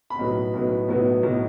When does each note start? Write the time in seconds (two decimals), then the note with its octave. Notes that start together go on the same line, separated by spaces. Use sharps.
0.10 B5
0.19 B1 A2 F#3 B3
0.54 B1 A2 F#3 B3
0.89 B1 A2 F#3 B3
1.23 B1 A2 F#3 B3